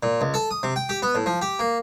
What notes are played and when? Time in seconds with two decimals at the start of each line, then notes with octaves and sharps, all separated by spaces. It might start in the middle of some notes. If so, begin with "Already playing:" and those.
0.03 A#2
0.21 C#2
0.34 A4
0.51 D#6
0.63 C3
0.76 G5
0.89 G4
1.02 B3
1.15 A2
1.26 F3
1.42 G4
1.59 A#3